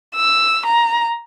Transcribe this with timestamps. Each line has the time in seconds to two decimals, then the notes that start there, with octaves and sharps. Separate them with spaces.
0.15 E6
0.65 A#5